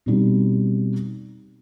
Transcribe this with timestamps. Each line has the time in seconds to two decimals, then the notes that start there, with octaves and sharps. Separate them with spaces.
0.06 B2 G3 C4 D#4